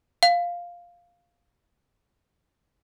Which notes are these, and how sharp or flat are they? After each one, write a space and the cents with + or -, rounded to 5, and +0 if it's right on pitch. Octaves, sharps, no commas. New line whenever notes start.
F5 +0